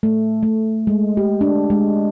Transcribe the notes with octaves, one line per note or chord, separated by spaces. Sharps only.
A3
A3
G#3
G4
D4
G#3